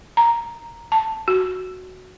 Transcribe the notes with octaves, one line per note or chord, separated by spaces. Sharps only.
A#5
A5
F#4